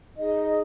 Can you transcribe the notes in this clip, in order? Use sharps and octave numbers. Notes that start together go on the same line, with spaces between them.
D#4 G#4 D#5